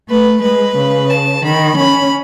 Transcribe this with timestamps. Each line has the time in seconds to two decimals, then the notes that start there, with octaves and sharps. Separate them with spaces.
0.09 A3 B4
0.42 G#3 B4
0.77 C#3
1.10 A5
1.43 D#3 B5
1.76 C#4 B5